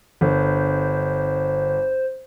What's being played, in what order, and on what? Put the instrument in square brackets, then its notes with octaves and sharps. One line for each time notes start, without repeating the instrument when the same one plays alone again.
[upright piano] G1 [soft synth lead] C5